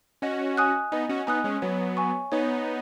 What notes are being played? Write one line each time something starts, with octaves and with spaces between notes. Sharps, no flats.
C#4 F#4 D#5
G#5 D#6 F#6
B3 D#4 D#5
C#4 F#4
B3 D#4 G#5 D#6 F#6
G#3 C#4
F#3 B3 C#5
G#5 C#6
B3 D#4 C#5